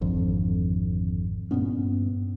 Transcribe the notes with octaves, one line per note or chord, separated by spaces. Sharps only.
G#1 F2 D3
G2 A#2 B3 C#4